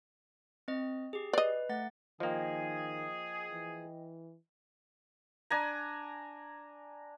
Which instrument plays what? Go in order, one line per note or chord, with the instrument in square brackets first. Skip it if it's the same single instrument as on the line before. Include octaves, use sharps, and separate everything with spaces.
[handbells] C4 D#5
G4 G#4
[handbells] B4 [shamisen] D5 D#5
[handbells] A3 F#5 A6
[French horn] D#3 [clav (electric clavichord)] F3 A#3 [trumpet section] G#4 [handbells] D#5 G5
[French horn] E3
[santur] D4 G#5 A#5